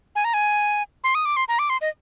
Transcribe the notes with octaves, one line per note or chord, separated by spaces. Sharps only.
G#5
A#5
G#5
C6
D#6
D6
C6
A#5
D6
C6
D#5